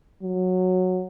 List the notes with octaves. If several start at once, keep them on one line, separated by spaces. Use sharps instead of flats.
F#3